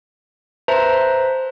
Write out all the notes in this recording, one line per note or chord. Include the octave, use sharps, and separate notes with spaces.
B4 C5 E5 A5 A#5 C6